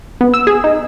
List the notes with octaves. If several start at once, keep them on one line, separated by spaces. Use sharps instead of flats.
B3
E6
G#4
D#4